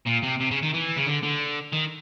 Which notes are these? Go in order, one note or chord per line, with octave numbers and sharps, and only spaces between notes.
A#2
C3
C3
C#3
D#3
E3
C#3
D3
D3
D#3